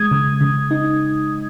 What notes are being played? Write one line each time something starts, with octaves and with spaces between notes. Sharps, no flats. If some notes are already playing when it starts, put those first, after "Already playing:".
Already playing: G#3 D#6 G#6
C#3
C#3
D#4